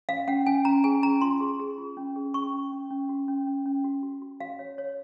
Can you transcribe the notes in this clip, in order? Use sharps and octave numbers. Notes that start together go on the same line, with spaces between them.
C#4 F5
C#4 F#5
C#4 G#5
C#4 A#5
G#4 G#5
C#4 A#5
F4 C6
G#4
G#4
F4
C#4
G#4
C#4 C#6
C#4
C#4
C#4
F#4
C#4
C#4
C#4
F#4
F#4
F#4
F#4 F5
C#5
C#5